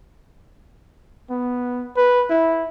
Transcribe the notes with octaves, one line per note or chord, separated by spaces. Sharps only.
B3
B4
E4